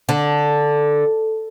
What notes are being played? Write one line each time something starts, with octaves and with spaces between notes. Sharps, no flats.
D3